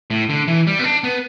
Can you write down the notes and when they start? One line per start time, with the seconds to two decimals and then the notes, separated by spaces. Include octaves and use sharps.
0.10 A2
0.29 D3
0.48 E3
0.67 G3
0.79 B3
0.84 D4
1.04 B3